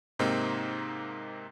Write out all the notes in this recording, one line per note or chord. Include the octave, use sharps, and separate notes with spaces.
G#2 C3 A#3 C4 D#4